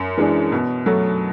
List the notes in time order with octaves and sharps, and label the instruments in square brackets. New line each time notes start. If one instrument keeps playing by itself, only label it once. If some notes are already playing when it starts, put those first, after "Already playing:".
Already playing: [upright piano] F#2
E3 G#3 D4
B2
F#3 A3